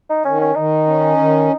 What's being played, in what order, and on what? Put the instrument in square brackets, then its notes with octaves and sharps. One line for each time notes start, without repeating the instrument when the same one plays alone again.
[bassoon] D#4
[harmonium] D#3 [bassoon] C#4
[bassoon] C#4
[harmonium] D#3 [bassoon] D#4
[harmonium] C#4
D#3